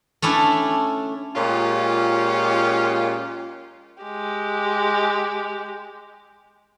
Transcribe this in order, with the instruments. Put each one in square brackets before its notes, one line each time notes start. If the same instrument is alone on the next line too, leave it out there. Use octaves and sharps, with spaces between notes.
[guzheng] A3 C#4 D4 E4
[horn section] A#2 G#3 C#4 F4 G4
[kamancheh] G#3 G4